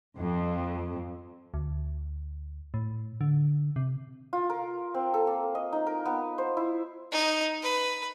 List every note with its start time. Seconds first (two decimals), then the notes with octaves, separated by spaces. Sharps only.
0.17 F2
1.54 D2
2.74 A2
3.21 D3
3.76 C3
4.33 F4
4.50 A#4
4.94 C4
5.14 A4
5.27 A#3
5.55 D#5
5.72 D#4
5.87 A#4
6.05 B3
6.38 C5
6.57 E4
7.12 D#4
7.62 B4